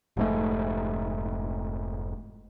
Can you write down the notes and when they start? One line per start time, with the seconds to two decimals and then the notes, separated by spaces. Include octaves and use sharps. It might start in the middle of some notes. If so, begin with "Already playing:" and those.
0.17 F1 G#2 A3